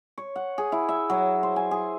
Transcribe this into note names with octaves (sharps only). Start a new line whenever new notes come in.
C#5
F#5
G#4
E4
E5
F#3
C5
G#5
G#4